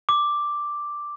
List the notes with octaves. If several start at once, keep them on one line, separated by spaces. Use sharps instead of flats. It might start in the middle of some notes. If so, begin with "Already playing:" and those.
D6